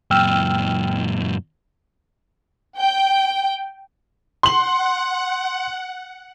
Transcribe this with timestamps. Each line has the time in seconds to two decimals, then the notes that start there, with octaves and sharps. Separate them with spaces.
0.11 F#2 A#2 G5 E6 F6
2.77 G5
4.43 F#5 C6 F#7